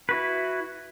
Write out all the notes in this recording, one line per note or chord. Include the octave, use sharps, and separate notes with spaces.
E4 F#4 B4